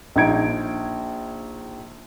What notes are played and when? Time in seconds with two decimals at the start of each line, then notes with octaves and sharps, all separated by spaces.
0.16 A#1 D#4 G#6 D7